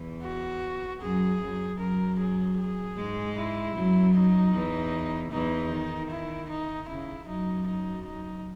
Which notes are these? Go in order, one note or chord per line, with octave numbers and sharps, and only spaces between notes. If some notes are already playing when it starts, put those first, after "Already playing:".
Already playing: E2 E3
F#4
F#2 F#3 G#4
F#2 F#3
F#2 F#3 A#4
G#4
G#4
G#2 G#3
E4
F#2 F#3
D#4
E2 E3
E2 E3 D#4
D#3
E4
D#4
C#3 E4
F#2 F#3 D#4
D#4
D#4